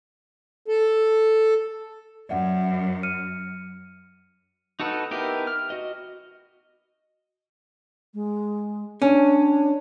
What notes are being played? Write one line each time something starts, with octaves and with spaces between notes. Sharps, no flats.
A4
F#2 D5 E5 F#5
F6 C#7 D#7
D#4 F#4 A4 B4
B3 D#4 E4 G4 A#4
F6
F#4 D#5
G#3
C#4 D4